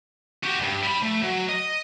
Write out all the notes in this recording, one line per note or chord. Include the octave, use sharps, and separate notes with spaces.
F#4 G4
E2 G2
G3 B5
A3
F#3
D#5